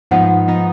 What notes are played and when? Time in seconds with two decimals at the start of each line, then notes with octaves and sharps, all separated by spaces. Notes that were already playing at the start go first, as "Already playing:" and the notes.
0.11 G#2 F3 B3 D#4 F#5
0.48 F3 B3 D#4